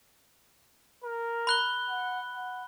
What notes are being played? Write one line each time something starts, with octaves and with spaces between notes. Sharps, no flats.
A#4
B5 F#6 G7
F#5
F#5